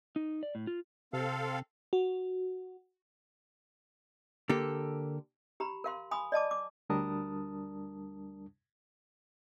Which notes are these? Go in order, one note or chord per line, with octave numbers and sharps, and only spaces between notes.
D#4
D5
A2
F4
C3 C4 A4 F5
F#4
D3 A#3 G4 A4
G4 A#5 B5
A#4 F5 C6
G#5 B5 C6 D#6
D5 D#5 A5 D6
D6
D2 G3 D4 A#4 A5 D#6